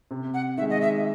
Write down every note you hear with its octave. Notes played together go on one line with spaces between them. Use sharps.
C3
F#5
D#3 G#3 E5
D#5
E5